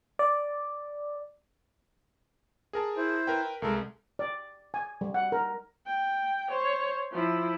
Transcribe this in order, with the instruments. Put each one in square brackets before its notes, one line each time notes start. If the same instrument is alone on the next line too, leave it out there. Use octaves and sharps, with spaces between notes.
[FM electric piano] D5
[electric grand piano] G#4 A#4 A5
[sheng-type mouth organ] E4 C5
[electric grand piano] A#4 B4 G5
[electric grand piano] C2 G#3 [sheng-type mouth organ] A4 A#4
[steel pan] D5
G#5
G3
F#5
A#4
[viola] G5
C5 C#5
F3 E4